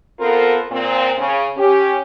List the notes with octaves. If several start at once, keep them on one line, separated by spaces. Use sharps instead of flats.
B3 C4 F4 A4 A#4
A#2 C4
C#3
C#4 G4